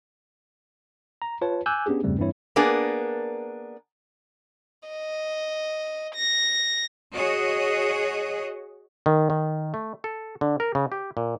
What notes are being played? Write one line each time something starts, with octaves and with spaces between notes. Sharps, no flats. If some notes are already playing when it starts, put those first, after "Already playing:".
A#5
F4 B4 C#5 A5
G#5 D6 E6 F#6 G6
B3 C#4 D4 G4 G#4
E2 G2 C#3 G3 A3 C4
G2 E3 C4 E4 C#5
A#3 B3 D4 G#4 A#4
D#5
A#6
F#4 G#4 C#5 D#5
D#3
D#3
A3
A4
D3
A#4
C#3
G4
A#2